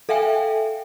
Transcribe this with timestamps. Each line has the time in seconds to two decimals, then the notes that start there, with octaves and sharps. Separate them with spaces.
0.09 A4 E5 F5 G5 G#5